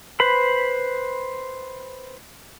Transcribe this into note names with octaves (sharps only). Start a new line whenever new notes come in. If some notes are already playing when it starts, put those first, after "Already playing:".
B4 C5 B5